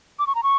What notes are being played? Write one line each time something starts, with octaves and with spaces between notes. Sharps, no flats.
D6
C#6
A#5
C#6